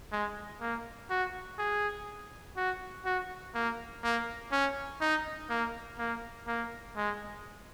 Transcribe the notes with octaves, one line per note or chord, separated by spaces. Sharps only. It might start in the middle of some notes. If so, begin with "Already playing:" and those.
G#3
A#3
F#4
G#4
F#4
F#4
A#3
A#3
C#4
D#4
A#3
A#3
A#3
G#3